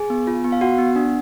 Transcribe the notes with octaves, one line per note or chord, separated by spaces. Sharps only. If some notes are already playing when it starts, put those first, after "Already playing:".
Already playing: G#4 G#5
B3
F4
B3
F5
F#4 F#5
B3
D4